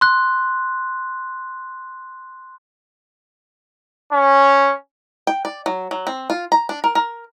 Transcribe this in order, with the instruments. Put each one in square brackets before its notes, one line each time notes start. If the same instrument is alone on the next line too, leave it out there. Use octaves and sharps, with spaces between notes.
[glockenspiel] C6 F#6
[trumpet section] C#4
[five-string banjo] G5
D5
F#3
F#3
C4
F4
A#5
D4
A#4
A#4